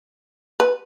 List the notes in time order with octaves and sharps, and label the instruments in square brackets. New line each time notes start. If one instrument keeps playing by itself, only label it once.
[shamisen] B4